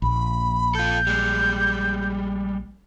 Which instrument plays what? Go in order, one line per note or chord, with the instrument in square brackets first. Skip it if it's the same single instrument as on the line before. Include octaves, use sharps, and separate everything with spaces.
[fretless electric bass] A#1 [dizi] B5
[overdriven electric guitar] F4 A4 [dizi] G6
[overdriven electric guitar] G3 G#3